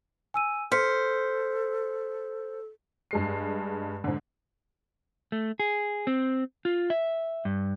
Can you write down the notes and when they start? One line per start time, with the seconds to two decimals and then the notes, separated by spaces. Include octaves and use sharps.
0.34 G#5 E6 D#7
0.72 A4 C5 F6 B6 C#7
3.11 G2 G#3 C7
4.04 G#2 D3
5.32 A3
5.60 G#4
6.07 C4
6.65 F4
6.90 E5
7.45 G2